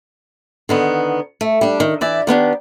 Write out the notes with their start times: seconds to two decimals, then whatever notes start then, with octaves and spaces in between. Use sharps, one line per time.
0.69 D3 D#3 B3
1.41 A3
1.61 G3 D4
1.80 D#3
2.01 E3 D5 E5
2.27 D#3 B3 D4 G4